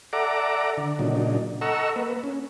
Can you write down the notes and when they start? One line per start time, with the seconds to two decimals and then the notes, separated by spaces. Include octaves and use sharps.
0.13 A4 D5 E5 F#5 A#5 D6
0.77 D3
0.99 A#2 C#3 F#3 D4 D#4
1.61 A4 D#5 F#5 A#5 C#6 E6
1.96 A#3 B4
2.24 C#4